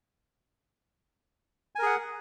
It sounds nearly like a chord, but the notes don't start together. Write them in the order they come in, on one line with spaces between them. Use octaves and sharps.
G#5 A#4 G#4 F#5